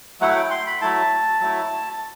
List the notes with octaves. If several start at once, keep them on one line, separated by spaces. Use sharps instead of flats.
F#3 A3 E4 F#5
G5
C6
B5
F#3 A3 E4 A5
F#3 A3 E4